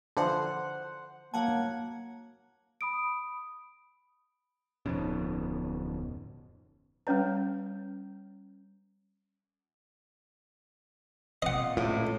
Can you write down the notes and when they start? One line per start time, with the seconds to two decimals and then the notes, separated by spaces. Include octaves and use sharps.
0.17 D3 E3 F3 C5 F#5 A5 C6
1.34 F#3 A#3 F#5 A5 G#6
2.81 B5 D#6 D7
4.86 D1 F2 B2 C#4 D#4
7.07 G3 C#4 B4 C#5 A#5
11.42 A#2 C4 F4 D#5 F#5
11.77 C#2 A2